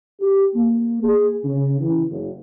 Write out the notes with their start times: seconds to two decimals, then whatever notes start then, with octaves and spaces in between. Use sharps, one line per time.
0.20 G4
0.55 A#3
1.03 G#4
1.44 C#3
1.81 E3
2.10 F#1